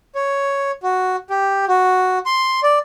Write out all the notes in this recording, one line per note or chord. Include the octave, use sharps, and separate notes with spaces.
C#5
F#4
G4
F#4
C6
D5